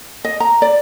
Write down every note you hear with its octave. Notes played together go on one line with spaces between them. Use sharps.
D#5
A#5
D5